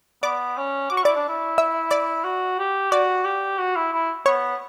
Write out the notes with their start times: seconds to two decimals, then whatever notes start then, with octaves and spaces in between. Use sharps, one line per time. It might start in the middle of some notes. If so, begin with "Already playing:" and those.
0.23 B3 D5 D6
0.57 C#4
0.90 F#4 D6
0.97 C#6
1.03 E4 D5 D6
1.15 D4
1.28 E4
1.58 E5 E6
1.91 D5 D6
2.24 F#4
2.59 G4
2.91 F#4 D5 D6
3.25 G4
3.58 F#4
3.76 E4
3.92 E4
4.26 B3 C#5 C#6